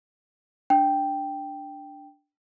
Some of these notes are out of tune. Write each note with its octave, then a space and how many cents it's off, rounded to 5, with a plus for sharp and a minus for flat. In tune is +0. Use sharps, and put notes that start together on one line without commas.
D4 +0 G5 +0